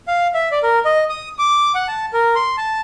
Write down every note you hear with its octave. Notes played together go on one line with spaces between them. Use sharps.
F5
E5
D5
A#4
D#5
D#6
D6
F#5
A5
A#4
C6
A5